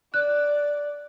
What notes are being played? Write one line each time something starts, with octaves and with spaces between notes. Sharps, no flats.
D5 F#6